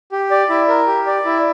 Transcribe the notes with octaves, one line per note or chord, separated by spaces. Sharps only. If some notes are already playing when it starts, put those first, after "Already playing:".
G4
D5
E4
A#4
G4
D5
E4